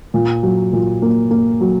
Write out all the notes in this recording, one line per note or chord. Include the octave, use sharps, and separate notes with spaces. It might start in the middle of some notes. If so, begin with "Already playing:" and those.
A#2
F#3
A#2
A#3
A#3
F#3